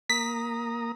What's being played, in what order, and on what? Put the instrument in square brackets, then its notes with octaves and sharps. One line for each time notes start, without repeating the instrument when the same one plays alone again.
[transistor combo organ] A#3 A#5 D#6 [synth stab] B6